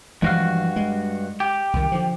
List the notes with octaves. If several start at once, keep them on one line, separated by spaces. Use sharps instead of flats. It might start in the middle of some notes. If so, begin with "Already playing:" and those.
G2 E3 F3 G#3 F#4 F5
G#3
G4
C2 D#3
D3 F3